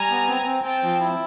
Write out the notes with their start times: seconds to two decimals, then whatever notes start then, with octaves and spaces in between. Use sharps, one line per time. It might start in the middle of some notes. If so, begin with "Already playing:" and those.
Already playing: G3 G#5 A#5
0.10 B3
0.28 C4
0.46 C4
0.64 C4 G5 A5
0.83 F3
1.00 E4